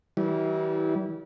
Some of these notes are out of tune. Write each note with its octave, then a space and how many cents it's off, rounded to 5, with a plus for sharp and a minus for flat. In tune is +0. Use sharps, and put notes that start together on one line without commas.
E3 -35 G3 -40 E4 -30